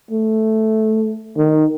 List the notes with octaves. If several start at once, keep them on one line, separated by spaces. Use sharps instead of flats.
A3
D#3